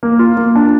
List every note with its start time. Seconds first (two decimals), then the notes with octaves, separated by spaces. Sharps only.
0.03 A#3
0.19 F4
0.37 A#3
0.55 D4